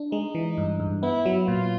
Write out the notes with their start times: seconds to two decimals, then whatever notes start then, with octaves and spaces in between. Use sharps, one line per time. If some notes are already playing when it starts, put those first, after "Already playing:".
Already playing: D4
0.12 G#3 D#4
0.35 E3
0.58 G2
0.80 G2
1.03 B3 E4
1.26 F#3
1.47 A#2 F4